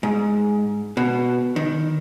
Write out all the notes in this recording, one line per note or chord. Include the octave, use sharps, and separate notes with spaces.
G#2
B2
D#3